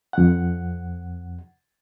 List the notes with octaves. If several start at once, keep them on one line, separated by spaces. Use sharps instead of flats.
F2 F#5